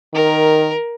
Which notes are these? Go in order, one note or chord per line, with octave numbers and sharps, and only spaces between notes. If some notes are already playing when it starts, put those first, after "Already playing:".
D#3 A#4